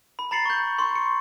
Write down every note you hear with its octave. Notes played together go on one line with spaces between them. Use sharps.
B5
A#5 B5 A6 C7 C#7 F#7
C#6 G6
C6 C#6
C#7